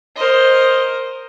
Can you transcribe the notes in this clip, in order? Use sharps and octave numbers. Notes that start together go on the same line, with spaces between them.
A#4 C5 D#5